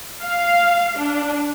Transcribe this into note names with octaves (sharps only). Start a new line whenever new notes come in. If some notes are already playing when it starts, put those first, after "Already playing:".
F5
D4